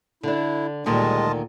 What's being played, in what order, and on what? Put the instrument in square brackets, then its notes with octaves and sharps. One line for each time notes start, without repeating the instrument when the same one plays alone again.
[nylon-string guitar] D3 D4 [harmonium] E4
[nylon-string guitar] D2 A#2 D#3 [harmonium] G3 G#3 [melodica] F4 D#5 A5